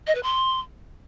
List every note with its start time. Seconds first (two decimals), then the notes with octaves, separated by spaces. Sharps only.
0.07 D#5
0.15 B4
0.23 C6